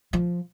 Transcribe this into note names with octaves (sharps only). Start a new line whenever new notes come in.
F3